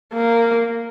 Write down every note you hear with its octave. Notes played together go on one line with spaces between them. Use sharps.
A#3